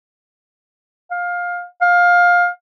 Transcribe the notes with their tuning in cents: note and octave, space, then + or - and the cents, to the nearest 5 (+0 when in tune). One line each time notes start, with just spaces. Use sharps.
F5 +20
F5 +20